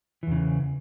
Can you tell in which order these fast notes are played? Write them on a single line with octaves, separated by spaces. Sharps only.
E3 E2 C#3